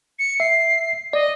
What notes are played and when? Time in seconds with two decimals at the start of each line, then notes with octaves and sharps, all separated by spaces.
0.19 C#7
0.40 E5 C7
1.13 D5 D#5